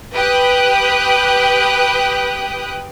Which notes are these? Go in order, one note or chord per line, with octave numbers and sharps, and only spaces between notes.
G4 B4 G5 D#6 F#6